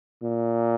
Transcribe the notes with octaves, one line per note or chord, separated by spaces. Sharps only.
A#2